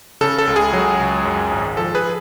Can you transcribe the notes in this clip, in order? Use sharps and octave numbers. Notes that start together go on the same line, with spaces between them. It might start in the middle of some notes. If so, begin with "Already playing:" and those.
C#3 A4
A4
C#2
G#4
F#3
C#2
F#2
G#1
F3 A4
G#4 B4